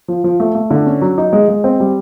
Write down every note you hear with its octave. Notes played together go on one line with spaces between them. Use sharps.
F3
F3
A3
A3
D3
C#4
F#3
D#4
G#3
G#3
C4
G3